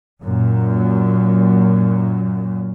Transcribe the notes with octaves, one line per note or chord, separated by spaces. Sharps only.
F#2 A#2